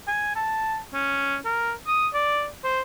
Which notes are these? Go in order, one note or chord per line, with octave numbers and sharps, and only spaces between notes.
G#5
A5
C#4
A#4
D#6
D5
C5